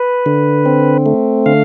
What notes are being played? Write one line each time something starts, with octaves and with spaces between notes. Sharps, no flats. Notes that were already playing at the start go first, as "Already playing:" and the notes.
Already playing: B4
D3
C4
A3
D3 F5